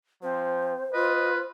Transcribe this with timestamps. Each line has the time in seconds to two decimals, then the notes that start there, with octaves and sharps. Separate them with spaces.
0.23 F3 C4 C5
0.93 F4 B4 D#5